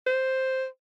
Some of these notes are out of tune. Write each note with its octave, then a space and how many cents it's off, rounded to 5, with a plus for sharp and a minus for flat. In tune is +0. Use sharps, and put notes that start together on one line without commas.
C5 +0